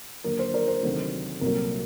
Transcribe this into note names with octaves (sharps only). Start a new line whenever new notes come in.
D#2 D3 F#3 A#4
C5
A#4 D5
C5
D2 C3 D#3 F#3
C2 A#2 F#3 A#4